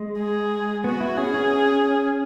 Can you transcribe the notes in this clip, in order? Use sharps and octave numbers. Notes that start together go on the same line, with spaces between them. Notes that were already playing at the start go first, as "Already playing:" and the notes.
Already playing: G#3
G#4
B3 F#4
E4
C#4 G#4
C#4